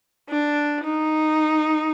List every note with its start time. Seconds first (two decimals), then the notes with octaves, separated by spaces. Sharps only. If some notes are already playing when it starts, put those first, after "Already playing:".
0.29 D4
0.84 D#4